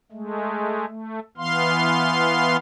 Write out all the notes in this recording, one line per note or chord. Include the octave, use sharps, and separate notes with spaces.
G#3 A3
A3
E3 B3 F5 C6